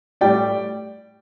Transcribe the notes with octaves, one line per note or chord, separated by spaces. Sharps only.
A2 G3 D5 G5